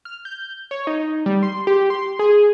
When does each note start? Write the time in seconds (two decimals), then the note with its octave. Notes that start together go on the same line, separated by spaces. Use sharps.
0.05 F6
0.25 G6
0.71 C#5
0.87 D#4
1.26 G3
1.43 C6
1.67 G4
1.90 C6
2.19 G#4